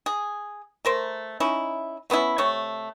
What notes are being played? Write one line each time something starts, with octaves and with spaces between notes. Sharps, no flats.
G#4
A3 A#4 C5
C#4 D#4 E4
A3 B3 C#4 E4
C3 A3 C#5